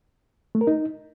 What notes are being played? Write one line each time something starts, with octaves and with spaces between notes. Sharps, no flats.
A3
A#4
D#4